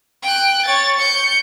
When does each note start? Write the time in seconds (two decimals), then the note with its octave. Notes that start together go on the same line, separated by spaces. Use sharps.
0.23 G5 F#6
0.66 C#5 A6
0.98 G6 C#7